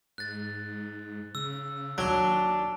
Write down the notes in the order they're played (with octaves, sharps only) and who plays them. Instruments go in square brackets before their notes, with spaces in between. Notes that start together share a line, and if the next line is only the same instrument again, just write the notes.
[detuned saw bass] G#2 [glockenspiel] F#6 A6
[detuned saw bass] C#3 [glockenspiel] E6
[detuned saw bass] D#2 [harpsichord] F#3 [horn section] D4 A5 [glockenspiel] D7 G7